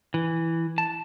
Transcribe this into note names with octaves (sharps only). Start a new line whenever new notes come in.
E3
A5